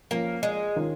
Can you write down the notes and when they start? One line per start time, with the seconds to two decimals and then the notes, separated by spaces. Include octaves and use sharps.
0.11 F3 A#3 C#4 A#4
0.43 G#3
0.76 D#3 C#4 F4 A#4